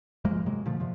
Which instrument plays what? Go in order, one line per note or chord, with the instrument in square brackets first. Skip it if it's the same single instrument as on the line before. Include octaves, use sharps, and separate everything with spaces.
[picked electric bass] G2 F3 G#3 A#3
C3 F#3 G#3 A#3
A#2 D3 F3 A3
G2 C3 F3